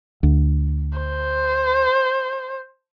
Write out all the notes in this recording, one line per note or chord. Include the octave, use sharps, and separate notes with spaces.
D2
C5